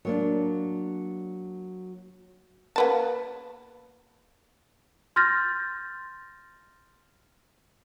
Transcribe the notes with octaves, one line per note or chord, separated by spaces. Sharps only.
F#3 A#3 D4
A#3 B3 A5
C6 F6 G6 A6 A#6